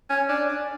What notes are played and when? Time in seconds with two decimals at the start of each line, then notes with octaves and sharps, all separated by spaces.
0.10 C#4
0.29 D4
0.49 D4